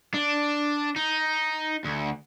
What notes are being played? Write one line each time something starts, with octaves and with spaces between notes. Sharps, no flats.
D4
D#4
D2